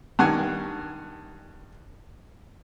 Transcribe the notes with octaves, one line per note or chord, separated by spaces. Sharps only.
G2 D#3 F#5 G#5 C#6